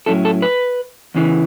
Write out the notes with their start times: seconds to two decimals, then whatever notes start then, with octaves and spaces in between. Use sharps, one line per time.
0.06 A2 F#3 C#4 E4 A4
0.25 A4
0.42 B4
1.15 E2 C#3 E3